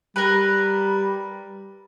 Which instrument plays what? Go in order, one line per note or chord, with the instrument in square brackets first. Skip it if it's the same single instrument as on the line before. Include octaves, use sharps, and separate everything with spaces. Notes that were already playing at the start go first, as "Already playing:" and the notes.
[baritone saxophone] G3 [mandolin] A#4 B4